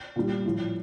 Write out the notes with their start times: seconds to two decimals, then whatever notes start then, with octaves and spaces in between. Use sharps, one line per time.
0.16 A#2 G3
0.45 A2 F3